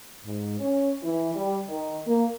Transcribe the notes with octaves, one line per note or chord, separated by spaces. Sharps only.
G#2
C#4
E3
G3
D#3
A#3